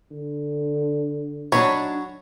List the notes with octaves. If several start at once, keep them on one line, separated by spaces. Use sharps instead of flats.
D3
F#3 D4 D#4 C#5 B5 C#6